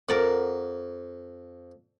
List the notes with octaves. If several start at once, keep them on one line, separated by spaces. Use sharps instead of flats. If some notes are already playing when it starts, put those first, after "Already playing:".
F2 A#4 D5 F#5